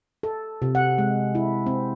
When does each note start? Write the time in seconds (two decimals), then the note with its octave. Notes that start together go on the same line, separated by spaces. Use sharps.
0.23 A4
0.62 C3
0.75 F#5
0.98 G#3
1.35 E4
1.66 C4